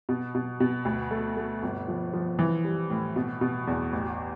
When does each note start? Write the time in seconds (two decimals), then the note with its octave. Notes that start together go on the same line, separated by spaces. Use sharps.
0.09 B2
0.35 B2
0.60 B2
0.85 D2
1.11 A3
1.36 A3
1.63 G1
1.88 F3
2.13 F3
2.39 E3
2.64 G3
2.90 A2
3.16 B2
3.41 B2
3.67 E2
3.93 A1